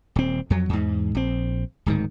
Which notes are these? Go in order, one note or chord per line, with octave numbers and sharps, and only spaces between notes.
D#1 C4
F2 F#3
E2 G#2
A#1 C4
D1 G#2 D#3